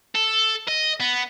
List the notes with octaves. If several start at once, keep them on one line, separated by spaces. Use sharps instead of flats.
A4
D#5
B3